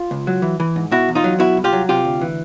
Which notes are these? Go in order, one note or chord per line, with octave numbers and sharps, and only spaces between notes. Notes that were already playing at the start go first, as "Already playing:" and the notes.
Already playing: F4
C#2
F#3
E3
E3
G#2
B2 E4 F#4
E2
D#4 F4
F#3
B2 E4 F#4
C2
F4 G4
F#3
C3 F4 G4
D2
E3